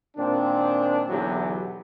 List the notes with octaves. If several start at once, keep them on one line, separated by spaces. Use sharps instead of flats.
A#2 D#3 C4 D4
B1 E2 D3 E3 F#3 G4